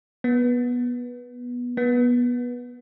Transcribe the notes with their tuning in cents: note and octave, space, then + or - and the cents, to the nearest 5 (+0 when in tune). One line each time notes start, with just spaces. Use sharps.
B3 -15
B3 -20